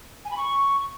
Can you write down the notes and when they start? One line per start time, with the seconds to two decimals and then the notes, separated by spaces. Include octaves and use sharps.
0.25 G#5
0.31 B5
0.37 C#6